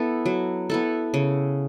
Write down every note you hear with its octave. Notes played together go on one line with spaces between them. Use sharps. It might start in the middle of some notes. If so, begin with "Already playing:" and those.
Already playing: B3 E4 A4
F#3
B3 E4 A4
C#3